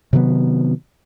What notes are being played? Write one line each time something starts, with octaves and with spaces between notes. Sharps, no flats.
C3 D#3 F#3 B3